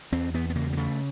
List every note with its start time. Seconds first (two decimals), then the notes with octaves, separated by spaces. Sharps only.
0.12 E2 C4
0.34 E2 B3
0.50 B3
0.55 C#3 A#3
0.73 A#3
0.77 C#3 A3